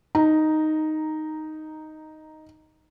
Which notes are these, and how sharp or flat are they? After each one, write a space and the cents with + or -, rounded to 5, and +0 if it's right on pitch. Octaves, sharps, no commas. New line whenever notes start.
D#4 +0 A#5 -5